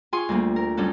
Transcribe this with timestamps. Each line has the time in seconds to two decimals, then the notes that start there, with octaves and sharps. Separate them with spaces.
0.13 F4 G#4 G#5 C6 C#6
0.29 D2 G3 A#3
0.56 A#4
0.77 F#2 G3 C#4 A4 F#5